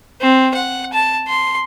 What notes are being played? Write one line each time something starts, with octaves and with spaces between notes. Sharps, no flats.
C4
F#5
A5
C6